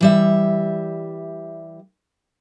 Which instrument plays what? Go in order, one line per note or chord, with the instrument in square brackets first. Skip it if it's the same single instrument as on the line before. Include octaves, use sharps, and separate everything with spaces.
[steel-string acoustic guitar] E3 G3 E5